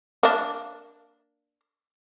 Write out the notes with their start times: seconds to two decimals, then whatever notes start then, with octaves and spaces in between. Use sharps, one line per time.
0.23 A#3 D4